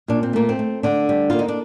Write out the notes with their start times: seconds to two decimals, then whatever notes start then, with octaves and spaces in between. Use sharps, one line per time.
0.08 A#2 D4
0.23 C4
0.33 A3 A#3
0.49 C4
0.59 A3
0.83 D3 D4
1.09 G3
1.30 A#3 F4
1.39 D#4
1.48 D4